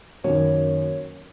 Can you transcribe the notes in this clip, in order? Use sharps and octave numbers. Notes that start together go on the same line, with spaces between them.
F#2 D#3 F#3 A#3 C#5